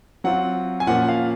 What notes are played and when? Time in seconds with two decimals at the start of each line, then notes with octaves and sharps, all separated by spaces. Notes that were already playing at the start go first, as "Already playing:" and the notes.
0.24 F#3 C4 F4 F#5
0.80 G#5
0.87 A#2 F3 A#3 C#4 F4 F#5
1.08 F5